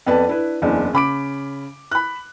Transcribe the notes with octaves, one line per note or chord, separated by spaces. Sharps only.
F2 B3 B4 D5 A5
D4 E4 B4
F#1 E2 D4
C#3 B5 D6 D7
B5 F#6